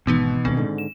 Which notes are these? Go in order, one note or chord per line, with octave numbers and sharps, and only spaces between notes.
D#1 G#1 B2 E3 B3 D#4
E1 D2 A#2 D#3 C4
G#2 D3
E7